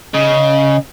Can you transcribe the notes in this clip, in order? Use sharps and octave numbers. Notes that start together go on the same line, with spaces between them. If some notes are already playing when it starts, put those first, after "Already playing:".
C#3 D#5